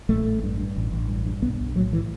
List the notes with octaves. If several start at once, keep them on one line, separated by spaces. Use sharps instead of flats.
A1 A3
A1
G2
G2
A1
A1
G2
G2
B1 B3
B1
A2 F#3
A2 E3